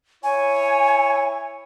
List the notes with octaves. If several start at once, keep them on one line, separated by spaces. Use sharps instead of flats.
E4 C#5 G#5